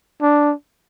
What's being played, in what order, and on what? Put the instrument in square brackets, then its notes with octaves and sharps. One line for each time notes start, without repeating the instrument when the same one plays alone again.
[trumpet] D4